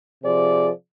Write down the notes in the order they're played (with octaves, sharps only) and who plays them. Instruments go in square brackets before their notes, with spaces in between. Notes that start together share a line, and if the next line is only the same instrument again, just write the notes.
[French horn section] C3 F3 G#4 C5 D5